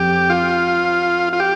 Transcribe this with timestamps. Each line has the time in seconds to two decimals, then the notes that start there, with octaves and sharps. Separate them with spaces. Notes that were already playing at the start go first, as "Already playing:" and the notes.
Already playing: F2 F3 G4
0.30 F4
1.33 F4
1.40 G4